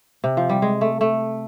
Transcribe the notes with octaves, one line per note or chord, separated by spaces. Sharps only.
C3
F3
G3
G#3
A3
A3